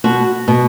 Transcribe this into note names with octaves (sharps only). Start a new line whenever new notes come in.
B2 F#4
B2